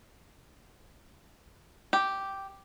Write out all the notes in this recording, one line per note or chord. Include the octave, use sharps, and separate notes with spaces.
G4